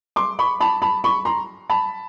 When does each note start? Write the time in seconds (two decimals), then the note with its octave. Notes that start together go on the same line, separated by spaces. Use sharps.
0.16 C6 D6
0.39 B5 C#6
0.60 A5 B5
0.82 A5 B5
1.04 B5 C#6
1.25 A#5 C6
1.70 A5 B5